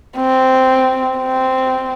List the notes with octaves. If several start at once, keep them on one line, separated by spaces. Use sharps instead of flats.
C4
C4